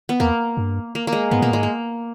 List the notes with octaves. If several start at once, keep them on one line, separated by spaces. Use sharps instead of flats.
B3
E2 A#3
G2
A#3
A#3
G#3
G#2 B3
A#2 A#3
G#2 G#3
A#3